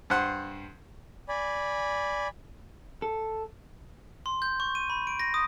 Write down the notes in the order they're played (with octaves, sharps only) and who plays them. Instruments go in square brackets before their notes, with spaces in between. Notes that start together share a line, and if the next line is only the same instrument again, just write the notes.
[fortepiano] G2 C5 F#5 C6
[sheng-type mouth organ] D5 G#5 B5
[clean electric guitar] A4
[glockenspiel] C6
G6
C#6
D#7
B5
D7
A#6
D#6